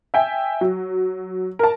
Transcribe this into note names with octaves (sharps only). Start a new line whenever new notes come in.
E5 G5 G#5
F#3
A#4 A5